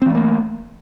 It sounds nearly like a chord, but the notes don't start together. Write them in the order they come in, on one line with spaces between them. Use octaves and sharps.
C4 E3 A3 A#3